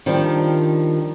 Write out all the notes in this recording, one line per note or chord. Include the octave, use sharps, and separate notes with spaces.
D#3 F3 G3 D4